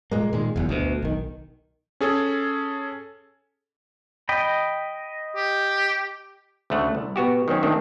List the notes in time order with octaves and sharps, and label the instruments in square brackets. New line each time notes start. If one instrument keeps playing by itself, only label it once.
[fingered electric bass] A#2 G#3 A#3
A#2 D#3 G#3
F#1 E2
D2 B2
B1 D#3
[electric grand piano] C#4 G#4 A4
[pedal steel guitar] D#5 G5 B5
[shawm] G4
[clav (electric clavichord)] D2 C#3 A3 F#5
C2
B2 B3 F#4 G4
D#3 F#3 C4 C#4
D#3 A3 C4 D4